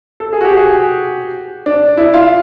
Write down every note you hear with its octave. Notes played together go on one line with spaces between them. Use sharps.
A4
G#4
F#4
G4
G#4
D4
E4
F4